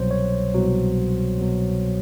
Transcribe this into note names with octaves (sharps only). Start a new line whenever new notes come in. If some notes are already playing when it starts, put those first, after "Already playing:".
Already playing: C2 B2 F#3 C5
C#5
C2 B2 F#3
C2 B2 F#3